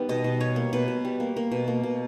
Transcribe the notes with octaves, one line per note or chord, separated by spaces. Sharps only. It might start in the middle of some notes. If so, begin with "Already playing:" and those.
Already playing: D#3 G3 B3
B2 D#5
B2
G3 C#5
A#3
B2 B4
B2
G3
A#3
A#3
B2
A#3
B2